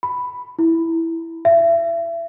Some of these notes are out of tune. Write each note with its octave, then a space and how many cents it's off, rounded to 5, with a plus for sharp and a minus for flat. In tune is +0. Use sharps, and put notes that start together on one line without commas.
B5 +5
E4 -5
E5 +35